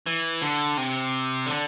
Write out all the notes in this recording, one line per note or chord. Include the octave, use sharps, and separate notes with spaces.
E3
D3
C3
D3